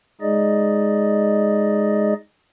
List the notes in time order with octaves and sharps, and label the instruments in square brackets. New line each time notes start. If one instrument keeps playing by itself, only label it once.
[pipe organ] G#3 D#4 G#4 D5 D#5